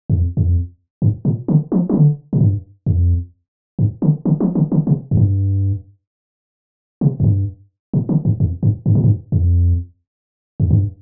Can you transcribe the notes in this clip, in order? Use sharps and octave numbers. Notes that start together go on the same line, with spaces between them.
F2
F2
G2
A#2
D3
F3
F3
D3
A#2
G2
F2
G2
D3
D3
F3
D3
D3
C3
F2
G2
C3
F2
G2
A#2
D3
G2
F2
G2
G2
A#2
G2
F2
F2
G2